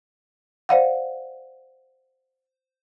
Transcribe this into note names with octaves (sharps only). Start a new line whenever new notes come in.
C5 D5 F5 F#5